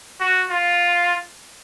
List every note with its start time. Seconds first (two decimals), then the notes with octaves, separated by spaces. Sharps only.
0.20 F#4
0.50 F4